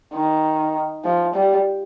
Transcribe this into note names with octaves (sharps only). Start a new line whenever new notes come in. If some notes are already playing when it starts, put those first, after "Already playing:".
D#3
F3
G3